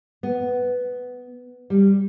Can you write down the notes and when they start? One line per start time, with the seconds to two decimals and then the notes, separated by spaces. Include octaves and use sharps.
0.23 B3
1.70 G3